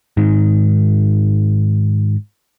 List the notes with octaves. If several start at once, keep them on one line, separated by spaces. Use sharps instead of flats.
G#2 D#3